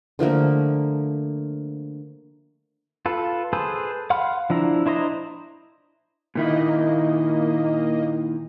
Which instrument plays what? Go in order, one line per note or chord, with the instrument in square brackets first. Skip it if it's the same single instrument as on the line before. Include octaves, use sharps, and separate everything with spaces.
[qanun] D3 F3 A3 A#3
[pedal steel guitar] F4 A4 B4
G#4 A4 B4 C5
F5 F#5 B5 C6 F6
F3 D4 E4 A#5
D4 E4 C5 D#5 A#5
[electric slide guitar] A#2 D#3 E4 [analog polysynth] A#3 D#5